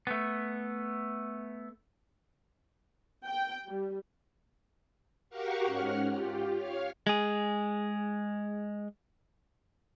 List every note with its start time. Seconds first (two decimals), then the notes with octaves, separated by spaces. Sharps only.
0.07 A3 B3
3.25 G5
3.68 G3
5.30 F#4 G4 A#4 F5 F#5 C#6
5.65 G#2 C#4 F#5 F6
6.07 F4 G4
6.54 C#5 F5 F6
7.07 G#3 G#4